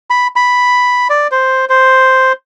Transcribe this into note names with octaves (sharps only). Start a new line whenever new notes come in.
B5
B5
D5
C5
C5